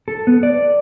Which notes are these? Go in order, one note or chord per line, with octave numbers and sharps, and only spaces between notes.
A4
B3
D5